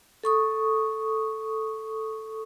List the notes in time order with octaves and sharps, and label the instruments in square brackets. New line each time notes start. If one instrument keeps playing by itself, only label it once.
[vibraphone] A4 C#6 D#6